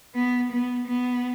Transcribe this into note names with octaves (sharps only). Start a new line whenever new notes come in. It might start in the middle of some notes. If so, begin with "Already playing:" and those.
B3
B3
B3